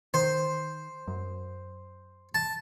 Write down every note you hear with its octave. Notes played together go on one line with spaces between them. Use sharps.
D#3 C5
F#2
A5